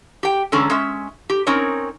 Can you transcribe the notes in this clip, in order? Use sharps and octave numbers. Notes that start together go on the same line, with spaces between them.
G4 G5
D3 E3 G#3 C#4 A4 A#5
G#3 C#4 E5
G4
C4 C#4 D#4 A#4 C#5